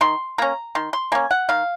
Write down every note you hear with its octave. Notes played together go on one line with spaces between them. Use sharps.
D#3 C6
A#3 C#4 A#5
D#3 C6
C6
A#3 C#4 G#5
F#5
D#3 F5